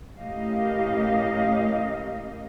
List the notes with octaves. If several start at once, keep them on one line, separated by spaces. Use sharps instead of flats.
A2 C#4 G4 A#4 D#5 F5